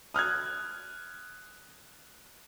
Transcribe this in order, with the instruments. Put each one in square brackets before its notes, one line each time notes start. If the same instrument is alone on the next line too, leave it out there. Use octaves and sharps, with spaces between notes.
[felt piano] D#6 F6 F#6 G#6